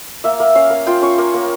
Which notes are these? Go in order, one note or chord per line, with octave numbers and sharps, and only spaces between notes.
A#3 E5
A#3
C#4 F5
A#3
F4 G5
C#4 C#6
A#3
A#3